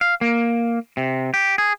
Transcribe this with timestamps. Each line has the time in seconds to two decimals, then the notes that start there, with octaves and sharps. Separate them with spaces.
0.01 F5
0.21 A#3
0.97 C3
1.34 G4
1.58 G#4